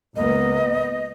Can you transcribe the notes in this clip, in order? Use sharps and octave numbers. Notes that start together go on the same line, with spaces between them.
C#2 A#3 B3 D#5